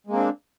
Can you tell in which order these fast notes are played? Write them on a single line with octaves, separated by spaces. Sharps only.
G#3 A#3 C4 D4